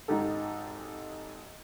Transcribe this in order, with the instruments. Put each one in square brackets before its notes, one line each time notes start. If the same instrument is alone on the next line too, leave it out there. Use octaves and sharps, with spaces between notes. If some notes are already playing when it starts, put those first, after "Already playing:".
[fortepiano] G#1 G#2 D#4 G4 A4